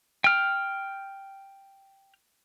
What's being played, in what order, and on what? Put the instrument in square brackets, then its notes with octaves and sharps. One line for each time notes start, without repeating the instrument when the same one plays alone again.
[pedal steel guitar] G5 F6